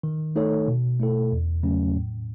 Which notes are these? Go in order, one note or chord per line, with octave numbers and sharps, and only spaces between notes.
D#3
A3 D#4 A4 C#5
B2
A3 E4 A4
E2
C#3 F#3 A3 C#4
A2